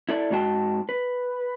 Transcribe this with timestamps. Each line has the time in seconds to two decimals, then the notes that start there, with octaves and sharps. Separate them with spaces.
0.09 E4 A4 D5
0.30 G#2 G#3 F#4 G5 A5
0.89 B4